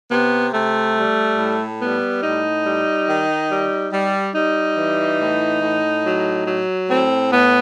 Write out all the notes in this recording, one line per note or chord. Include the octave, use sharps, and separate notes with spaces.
C3 B3
C3 A3
G3
A2
G3 B3
A2 D#4
G3
D#3
G3
G3
G3 D#4
E3
A2
A2
F#3
F#3
A2 C4
A2 B3